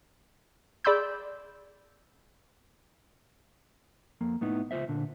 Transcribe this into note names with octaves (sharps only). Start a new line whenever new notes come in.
G#4 D5 B5 C6 E6 G6
F2 A#3
A2 B3 D#4 E4
C#2 F4 C5 E5
A#2 D3